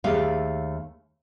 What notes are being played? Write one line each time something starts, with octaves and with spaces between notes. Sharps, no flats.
D#2 A3 G4 G#4 F5